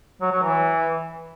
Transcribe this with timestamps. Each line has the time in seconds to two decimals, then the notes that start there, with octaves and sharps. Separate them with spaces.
0.21 F#3
0.32 F#3
0.43 E3